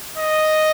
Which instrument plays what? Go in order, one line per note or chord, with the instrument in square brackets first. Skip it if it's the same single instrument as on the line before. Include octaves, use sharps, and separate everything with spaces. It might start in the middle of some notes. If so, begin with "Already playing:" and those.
[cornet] D#5